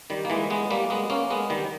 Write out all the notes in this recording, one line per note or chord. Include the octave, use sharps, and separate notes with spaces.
D#3 G3
A#3
E3 G#3
G#3 B3
G3 A#3
G#3 B3
A#3 C#4
G#3 B3
D#3 G3